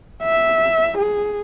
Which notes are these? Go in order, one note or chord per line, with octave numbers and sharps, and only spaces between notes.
E5
G#4